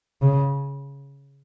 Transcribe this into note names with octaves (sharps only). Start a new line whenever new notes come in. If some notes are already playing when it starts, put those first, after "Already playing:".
C#3